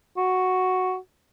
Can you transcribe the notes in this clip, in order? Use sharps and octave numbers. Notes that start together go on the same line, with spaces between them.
F#4